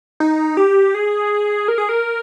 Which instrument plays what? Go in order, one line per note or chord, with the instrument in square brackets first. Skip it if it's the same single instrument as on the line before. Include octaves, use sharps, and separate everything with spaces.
[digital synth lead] D#4
G4
G#4
A#4
G#4
A#4